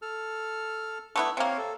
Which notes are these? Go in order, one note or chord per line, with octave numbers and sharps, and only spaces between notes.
A4 F6
A3 B3 D4 E4
C3 A#3 C4 C#5 F5
A4